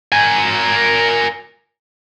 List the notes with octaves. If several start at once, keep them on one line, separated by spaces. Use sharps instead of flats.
A#4 G#5